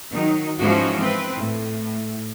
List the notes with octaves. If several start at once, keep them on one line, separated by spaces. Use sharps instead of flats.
D#3 F#3 D#4
G#2 E3 F3 G#3 C#4 F#4
C4 B4
A2